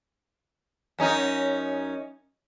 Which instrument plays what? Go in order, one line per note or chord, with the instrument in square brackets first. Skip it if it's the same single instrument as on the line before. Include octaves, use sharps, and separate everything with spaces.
[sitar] F#2 C#4 D#4